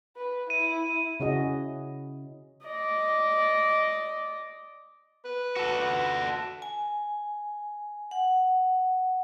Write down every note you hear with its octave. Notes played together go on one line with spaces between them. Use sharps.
B4
E4 D#7
C#3 C#4 E4 F#4 G#4 D#5
D5 D#5
B4
F#4 A4
G#5
F#5